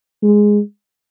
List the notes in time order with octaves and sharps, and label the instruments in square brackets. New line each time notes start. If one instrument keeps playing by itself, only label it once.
[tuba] G#3